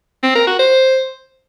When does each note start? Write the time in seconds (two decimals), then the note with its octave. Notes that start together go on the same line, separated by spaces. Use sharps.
0.23 C4
0.35 A#4
0.47 F#4
0.59 C5